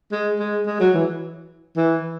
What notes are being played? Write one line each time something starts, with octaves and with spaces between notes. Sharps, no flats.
G#3
G#3
G#3
F#3
E3
E3